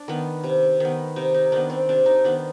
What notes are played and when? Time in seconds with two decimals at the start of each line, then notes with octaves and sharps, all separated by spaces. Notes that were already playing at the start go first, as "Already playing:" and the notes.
Already playing: D4
0.08 D#3 B3
0.44 C3
0.80 D#3 B3
1.16 C3 D#4
1.34 D#4
1.52 D#3 B3 D4
1.70 C4
1.89 C3 D4
2.06 D#4
2.24 D#3 B3 D4